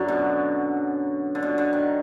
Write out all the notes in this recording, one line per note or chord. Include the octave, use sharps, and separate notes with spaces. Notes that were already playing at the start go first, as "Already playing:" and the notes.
Already playing: F#2 D3 F#3
B2
D3
B2
D3
D#3